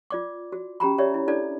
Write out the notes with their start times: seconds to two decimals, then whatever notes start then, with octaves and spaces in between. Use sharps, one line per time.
0.10 F4 D5 D6
0.52 F#4
0.80 C#4 G4 A#5 B5
0.98 G4 C#5 D5 E5
1.14 E4
1.28 D4 E4 A4 D5